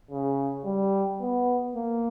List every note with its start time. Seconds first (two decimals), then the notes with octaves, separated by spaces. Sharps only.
0.11 C#3
0.65 G3
1.21 B3
1.75 A#3